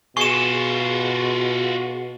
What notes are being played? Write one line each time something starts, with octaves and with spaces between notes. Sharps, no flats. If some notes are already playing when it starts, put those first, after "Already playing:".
B2 F4 F#4 G#4 C#6 E7